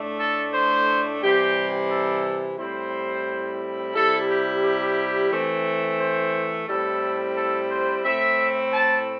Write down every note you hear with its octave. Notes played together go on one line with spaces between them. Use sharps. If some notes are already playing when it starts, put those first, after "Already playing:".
Already playing: A2 A3 D4
A4
C5
C3 E3 G3 C4 G4
A4
A2 G3 C4 E4 C5
C3 G3 E4 A4
G4
G4
E3 A3 C4
C5
A2 G3 C4 E4 A4
A4
C5
A2 A3 C4 E4 E5
A5